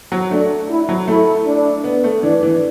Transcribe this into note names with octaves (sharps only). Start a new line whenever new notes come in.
F#3
A3 D4
E4
F#3
A3 E4
D4
B3
A3
E3 D4
E3